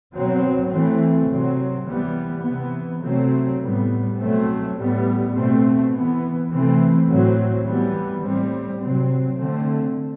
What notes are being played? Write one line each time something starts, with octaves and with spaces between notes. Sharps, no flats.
B2 F#3 C4
E3 A3 C4
C3 F#3 C4
E3 G3 B3
C3 E3 B3
C3 F#3 A3 C4
A2 G3 B3
B2 F#3 A3 C4
A2 G3 B3
B2 A3 C4
E3 B3
C3 E3 A3 C4
A2 F#3 C4
E3 G3 B3
A2 G3 C4
C3 F#3 C4
D3 A3 C4